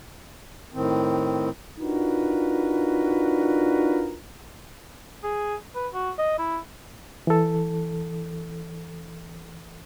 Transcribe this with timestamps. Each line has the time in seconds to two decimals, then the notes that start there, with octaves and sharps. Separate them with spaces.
0.74 A2 D#3 C4
1.80 D4 D#4 F4 F#4 A#4 B4
5.24 G#4
5.75 B4
5.94 F#4
6.18 D#5
6.39 E4
7.27 E3 A4